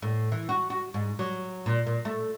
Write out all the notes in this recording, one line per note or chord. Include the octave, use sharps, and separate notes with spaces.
A2
E3
F#4
F#4
G#2
F#3
A#2
A#2
A3